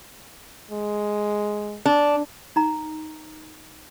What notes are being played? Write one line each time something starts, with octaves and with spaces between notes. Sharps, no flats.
G#3
D4
D#4 A#5